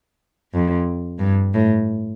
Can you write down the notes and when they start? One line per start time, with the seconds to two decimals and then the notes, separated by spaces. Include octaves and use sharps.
0.53 F2
1.19 G2
1.54 A2